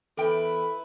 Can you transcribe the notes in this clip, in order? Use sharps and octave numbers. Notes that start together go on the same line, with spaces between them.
E2 E4 A4 B4 G5